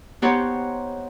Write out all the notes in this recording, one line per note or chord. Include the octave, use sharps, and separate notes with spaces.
B3 D#4 G4 C5 C#5 F#5